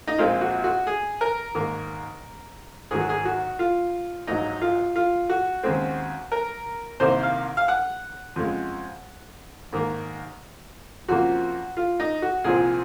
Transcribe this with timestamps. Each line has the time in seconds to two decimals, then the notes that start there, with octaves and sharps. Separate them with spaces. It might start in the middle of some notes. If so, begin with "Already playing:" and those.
0.07 D#4
0.18 A#1 A#2 G#3 C4 F4
0.41 F#4
0.64 F#4
0.87 G#4
1.21 A#4
1.55 G#2 D#3 A#3
2.91 G#2 D#3 F#3 G#4
3.00 F#4
3.09 G#4
3.25 F#4
3.59 F4
4.27 A#1 G#2 F#3 D#4
4.61 F4
4.96 F4
5.29 F#4
5.63 D#2 C#3 G#3 C4
6.32 A#4
7.00 C2 C3 D#3 A#3 C5
7.23 F5
7.57 F5
7.68 F#5
8.36 F2 C#3 G#3
9.73 G#2 D#3 A#3
11.08 F2 C#3 F3 A#3 F#4
11.77 F4
12.00 D#4
12.22 F#4
12.44 C2 A#2 F3 C4 G#4